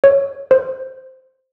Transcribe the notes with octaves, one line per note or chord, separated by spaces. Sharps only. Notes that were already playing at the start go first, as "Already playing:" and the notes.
C#5
C5